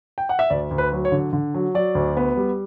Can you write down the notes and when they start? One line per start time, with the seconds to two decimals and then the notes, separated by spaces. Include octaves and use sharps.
0.18 G5
0.29 F#5
0.39 E5
0.50 D2 D5
0.71 D2
0.78 B4
0.92 F#3
1.05 C#5
1.12 D3
1.33 D3
1.54 F#3
1.75 F#3 D5
1.95 D2
2.17 B3
2.37 G3